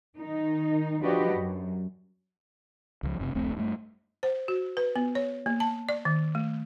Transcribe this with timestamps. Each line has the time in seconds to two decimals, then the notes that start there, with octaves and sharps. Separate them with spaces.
0.17 D#3 D#4
1.02 F3 D4 F#4 G4 B4 D#5
1.36 F#2
3.03 C#2 F3
3.19 F#1 C3
3.35 D#1 A#1 A3 C4
3.57 G2 A3
4.23 C5
4.48 F#4
4.77 B4
4.96 B3
5.15 C#5
5.46 A#3
5.60 A5
5.89 D5
6.05 D#3
6.35 A3